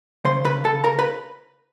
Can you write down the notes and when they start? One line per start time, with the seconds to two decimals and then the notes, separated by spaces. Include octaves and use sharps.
0.25 C#3 C5 C6
0.44 C#3 B4 B5
0.64 C#3 A4 A5
0.84 C#3 A#4 A#5
0.99 B4 B5